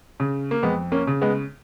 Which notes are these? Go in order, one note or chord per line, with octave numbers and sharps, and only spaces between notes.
C#3
A#3
F2 G#3 B3
A#3 C#4
C#3
G#3 B3